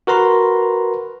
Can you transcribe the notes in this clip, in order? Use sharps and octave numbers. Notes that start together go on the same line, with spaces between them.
F#4 A#4 B4 A#5 C6